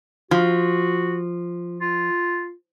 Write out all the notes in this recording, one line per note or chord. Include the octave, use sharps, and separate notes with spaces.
F3 F#4
F4